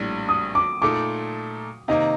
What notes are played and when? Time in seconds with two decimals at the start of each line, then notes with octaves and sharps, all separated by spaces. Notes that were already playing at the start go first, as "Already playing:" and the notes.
Already playing: A#1 A2 G3
0.29 D#6
0.55 D6
0.82 A#2 A3 D#4 A4 D6
1.88 C3 D#3 A#3 D#5